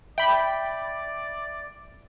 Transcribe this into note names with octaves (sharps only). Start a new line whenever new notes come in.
D5 E5 G5 B5